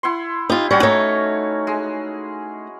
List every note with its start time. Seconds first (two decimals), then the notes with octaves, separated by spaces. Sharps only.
0.03 E4 F#5 C6
0.49 D#4 F4 G4
0.71 G3 C#4 F#4 C#5
0.83 A3 D#4 C#5 A#5
1.67 G#3